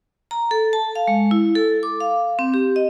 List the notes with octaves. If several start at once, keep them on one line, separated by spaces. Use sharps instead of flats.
A#5
A4
A5
F5
G#3
E4
A4
D6
F5
C4
G4
D#5